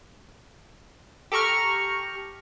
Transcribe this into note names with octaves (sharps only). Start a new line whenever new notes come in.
G4 A4 A#5 C#6 F6